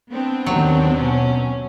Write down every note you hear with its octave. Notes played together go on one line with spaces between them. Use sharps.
B3 C4 D4
D#2 D#3 F#3
B2 C#4